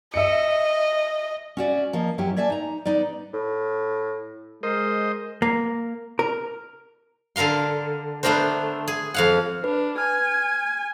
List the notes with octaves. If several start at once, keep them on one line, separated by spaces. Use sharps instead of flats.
D#5 E5 C#7
C#4 F#4 D5 E5
F3 A#3 D#5
F#2 F#3 C#4 E4 G4
A#3 D5 E5 G#5 A5
D#4 A#5
B3 D#4 B4 D5
A2
G#3 A#4 C5 D#5
A#3
A#4
D3 A4 A#4 F5 C6
A3 B3 D4 A#4 C5
G#4
F2 F5 F#5
D4 B4
G#5 F6